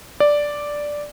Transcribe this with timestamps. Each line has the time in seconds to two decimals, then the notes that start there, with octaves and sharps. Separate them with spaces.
0.20 D5